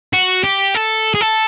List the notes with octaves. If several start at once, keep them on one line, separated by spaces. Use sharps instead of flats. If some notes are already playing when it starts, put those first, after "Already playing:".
F#4
G4
A4
G#4
A4